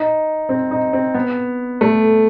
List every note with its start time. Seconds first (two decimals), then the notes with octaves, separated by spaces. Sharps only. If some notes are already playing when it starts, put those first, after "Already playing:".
Already playing: D#4
0.49 C4
0.71 D#4
0.93 C4
1.14 B3
1.81 A3